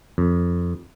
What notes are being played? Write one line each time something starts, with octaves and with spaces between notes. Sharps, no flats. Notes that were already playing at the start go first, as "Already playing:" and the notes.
F2